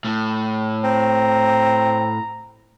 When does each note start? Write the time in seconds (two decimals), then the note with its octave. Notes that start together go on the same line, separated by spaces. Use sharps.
0.05 A2
0.84 C4 A#5